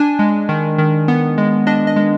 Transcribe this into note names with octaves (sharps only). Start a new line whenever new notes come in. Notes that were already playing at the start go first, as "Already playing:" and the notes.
Already playing: D4 G#5
G#3
D#3
D#3
B3
G#3
D4 D#5
D#5
G#3